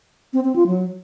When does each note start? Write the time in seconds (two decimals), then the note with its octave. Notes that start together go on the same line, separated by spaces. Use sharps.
0.33 C4
0.45 C4
0.56 F4
0.67 F#3